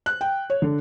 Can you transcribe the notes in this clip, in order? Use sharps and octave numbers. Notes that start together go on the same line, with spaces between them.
F#6
G5
C#5
D3